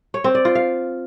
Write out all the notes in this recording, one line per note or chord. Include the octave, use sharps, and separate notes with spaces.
C#5
C4
D5
F4
F5